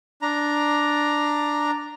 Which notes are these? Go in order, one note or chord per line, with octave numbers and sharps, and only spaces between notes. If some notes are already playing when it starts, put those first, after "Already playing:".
D4 A#5